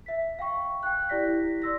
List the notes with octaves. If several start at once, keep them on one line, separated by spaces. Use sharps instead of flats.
E5 B6
F5 G5 C#6
G5 F#6
E4 G4 D5 A#6 B6
D5 C6 E6 A#6